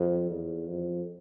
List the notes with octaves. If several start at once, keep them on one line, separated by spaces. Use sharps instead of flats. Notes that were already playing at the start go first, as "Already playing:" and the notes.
Already playing: F2
E2
F2